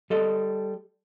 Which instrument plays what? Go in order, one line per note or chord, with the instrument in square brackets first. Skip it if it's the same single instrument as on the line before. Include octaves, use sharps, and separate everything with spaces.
[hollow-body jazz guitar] G3 A4 D#5